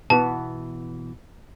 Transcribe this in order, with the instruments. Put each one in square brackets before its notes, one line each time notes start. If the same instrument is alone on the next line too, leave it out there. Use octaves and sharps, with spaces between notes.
[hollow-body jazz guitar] B2 E3 B3 [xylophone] A5